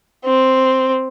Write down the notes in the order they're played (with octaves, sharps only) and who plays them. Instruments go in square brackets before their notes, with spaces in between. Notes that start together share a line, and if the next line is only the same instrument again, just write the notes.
[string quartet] C4